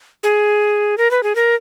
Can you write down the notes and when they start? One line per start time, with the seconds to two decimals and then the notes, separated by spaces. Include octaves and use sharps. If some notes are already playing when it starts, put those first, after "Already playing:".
0.23 G#4
0.98 A#4
1.11 B4
1.23 G#4
1.35 A#4